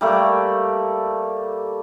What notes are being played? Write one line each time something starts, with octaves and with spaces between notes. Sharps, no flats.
G3 A3 A#3